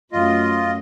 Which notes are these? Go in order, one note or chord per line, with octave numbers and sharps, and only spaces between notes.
F#2 A3 F4 D#5